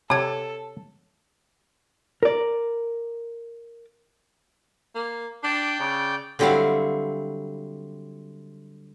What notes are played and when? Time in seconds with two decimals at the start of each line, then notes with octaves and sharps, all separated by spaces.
0.10 C3 A4 C#5 D5 F#5 A5 G#6
2.23 A#4 D5
4.95 A#3
5.43 D4 D5 G5
5.80 C#3
6.39 D3 F#3 G3 C4 E4 F5